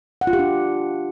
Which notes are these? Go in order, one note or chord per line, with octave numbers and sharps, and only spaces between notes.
F#5
F4
G4
D4